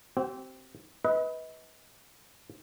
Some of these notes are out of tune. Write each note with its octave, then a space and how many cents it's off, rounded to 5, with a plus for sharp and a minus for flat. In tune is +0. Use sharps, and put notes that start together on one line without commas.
C4 +0 G4 -40
B4 +0 D#5 +35